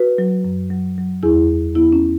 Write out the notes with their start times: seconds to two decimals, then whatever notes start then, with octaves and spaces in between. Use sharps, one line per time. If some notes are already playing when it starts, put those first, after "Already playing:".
Already playing: F#4 B4
0.18 F#3
0.45 F#2
0.71 F#3
0.98 F#3
1.23 E2 E4 G#4
1.50 E2
1.75 E2 B3 E4
1.93 C#4